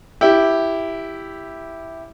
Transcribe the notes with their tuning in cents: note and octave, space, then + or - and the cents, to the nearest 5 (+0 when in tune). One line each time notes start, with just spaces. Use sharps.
E4 +0 G4 +0